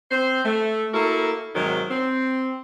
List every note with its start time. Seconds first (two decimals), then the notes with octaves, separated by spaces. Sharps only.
0.11 C4 C5
0.45 A3
0.94 A#3 E4 F#4 A4 A#4
1.55 G#2 C3 D#3 F#3
1.89 C4